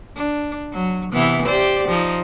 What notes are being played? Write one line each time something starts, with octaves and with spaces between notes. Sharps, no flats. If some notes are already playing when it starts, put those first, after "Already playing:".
D4
F#3
C3 E3 B3
G4 C5 D5
F3 D#4